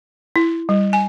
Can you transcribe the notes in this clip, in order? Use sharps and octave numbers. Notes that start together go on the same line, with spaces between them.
E4
G3
G#5